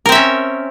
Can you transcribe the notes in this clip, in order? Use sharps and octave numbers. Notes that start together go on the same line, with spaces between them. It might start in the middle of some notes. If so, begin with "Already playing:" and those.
C4 C#4 A#4 E5